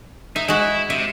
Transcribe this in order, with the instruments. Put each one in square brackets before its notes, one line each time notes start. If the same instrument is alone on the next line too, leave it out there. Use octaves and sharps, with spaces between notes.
[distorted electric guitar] D#4 [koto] E5
[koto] G#3 F#4 [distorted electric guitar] E4
[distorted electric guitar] C3 [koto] E5